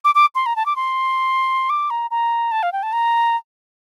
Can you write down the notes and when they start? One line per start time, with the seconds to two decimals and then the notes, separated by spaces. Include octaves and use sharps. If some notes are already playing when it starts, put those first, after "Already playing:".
0.04 D6
0.15 D6
0.35 C6
0.46 A#5
0.56 A5
0.66 D6
0.76 C6
1.70 D6
1.90 A#5
2.11 A#5
2.52 A5
2.63 F5
2.72 G5
2.83 A5
2.93 A#5